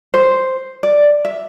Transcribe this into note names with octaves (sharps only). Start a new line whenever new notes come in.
C5
D5
E5